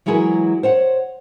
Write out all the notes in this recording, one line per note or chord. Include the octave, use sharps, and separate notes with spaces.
E3 F#3 G#3 E4 G#4 A#4
C5 C#5 F#5